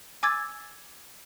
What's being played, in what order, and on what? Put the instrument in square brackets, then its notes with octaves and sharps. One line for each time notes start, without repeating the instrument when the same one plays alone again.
[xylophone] G#5 D6 E6 G#6 A6